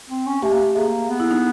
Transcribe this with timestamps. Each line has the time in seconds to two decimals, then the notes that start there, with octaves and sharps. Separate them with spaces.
0.10 C4
0.26 C#4
0.42 A3 G4
0.52 A#3
0.61 A3
0.76 A#3 G#4
1.09 B3
1.20 E4
1.31 D#4